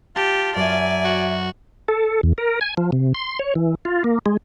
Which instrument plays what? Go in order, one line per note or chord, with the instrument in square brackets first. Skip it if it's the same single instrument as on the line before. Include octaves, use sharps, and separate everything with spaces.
[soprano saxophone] F4 [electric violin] G4 [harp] A5
[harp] F#2 [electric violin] D5 G#5 [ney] E5
[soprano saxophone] F#4
[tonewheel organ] A4
E2
A#4
G#5
F3
C3
C6
C#5
E3
F4
A#3
G#3